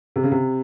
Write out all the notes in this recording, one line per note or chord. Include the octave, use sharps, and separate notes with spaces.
C3
C#3
C3